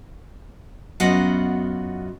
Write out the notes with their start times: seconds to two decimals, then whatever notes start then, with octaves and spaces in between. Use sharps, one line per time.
1.00 F#2 B3 F4 F#4 D#5 F#5